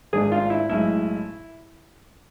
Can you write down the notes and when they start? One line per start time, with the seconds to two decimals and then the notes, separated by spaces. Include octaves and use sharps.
0.13 G#1 G#2 G#3 D4 G#4
0.32 F4
0.50 E4
0.69 B1 A2 G#3 E4